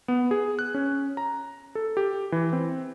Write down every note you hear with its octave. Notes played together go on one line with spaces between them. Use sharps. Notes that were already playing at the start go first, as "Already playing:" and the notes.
B3
G#4
F#6
C#4
A#5
A4
G4
E3
C4